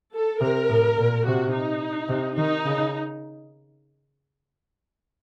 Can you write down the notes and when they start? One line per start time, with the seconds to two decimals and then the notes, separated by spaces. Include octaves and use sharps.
0.13 A4
0.40 C3 A#4
0.69 A2
0.97 A#2
1.25 C3 F#4
1.53 D#4
2.09 C3
2.36 D#3 D#4
2.65 C#3